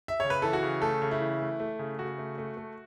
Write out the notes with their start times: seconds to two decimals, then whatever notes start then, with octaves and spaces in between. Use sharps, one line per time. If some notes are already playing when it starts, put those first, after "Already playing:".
0.08 E5
0.20 C#3 C#5
0.30 B4
0.42 E3 A4
0.53 F#4
0.63 C#3
0.82 A3 A4
1.02 C#3
1.11 E4
1.21 E3
1.41 A3
1.60 A3
1.79 C#3
1.99 C#3 F#4
2.18 A3
2.38 A3
2.57 A3